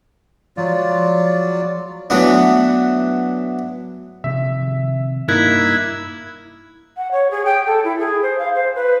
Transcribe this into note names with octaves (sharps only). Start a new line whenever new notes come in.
F3 F#3 G#3 F4 D5
E3 F#3 A3 B3 D4
C3 D#3 F3 E5
G2 A#3 D#4 E4 A#4 F#6 G#6
F#5
C#5
G#4
G5
A4
E4
G#4
C5
F5
C5
B4